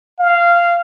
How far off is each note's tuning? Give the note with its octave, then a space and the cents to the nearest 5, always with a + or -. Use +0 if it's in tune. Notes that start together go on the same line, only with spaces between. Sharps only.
F5 -15